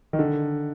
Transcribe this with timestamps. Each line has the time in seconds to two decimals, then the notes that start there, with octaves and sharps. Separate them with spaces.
0.13 D#3
0.19 D3